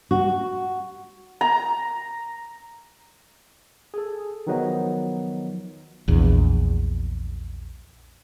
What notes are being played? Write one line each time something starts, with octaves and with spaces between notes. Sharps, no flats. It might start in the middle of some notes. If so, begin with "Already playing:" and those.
F#4
A#5
G#4 A4
D#3 F3 F#3 B3 D#4
A#1 E2